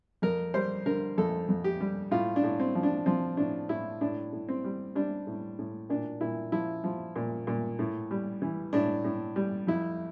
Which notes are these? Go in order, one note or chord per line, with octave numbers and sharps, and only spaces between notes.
F2 A#4
G3 C5
D3 A#4
F2 A4
F2
G4
G3
A2 F4
D4
A2
C4
F3
D4
F3 C4
A2 D4
A2 E4
A2 D4
A2
C4
G3
G3 D4
A2
A2
A#2 D4
A#2 E4
F3 E4
F3
A#2
A#2
A2
G3
E3
A2 D4
A2
G3
F2 E4